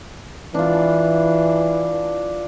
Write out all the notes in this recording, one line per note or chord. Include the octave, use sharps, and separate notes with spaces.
E3 D4 F4